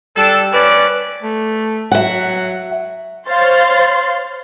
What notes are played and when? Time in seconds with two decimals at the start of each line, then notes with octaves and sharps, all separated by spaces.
0.17 G3 D4 A4
0.53 C#4 B4 D5
1.22 A3
1.91 F#3 E5 F#5
3.27 C5 C#5 F5 C6 A6